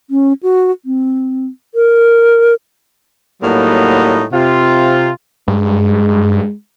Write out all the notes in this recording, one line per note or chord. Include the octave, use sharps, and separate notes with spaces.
C#4
F#4
C4
A#4
A2 F#3 G3 A#3 B3 D#4
C3 F4
G2 G#3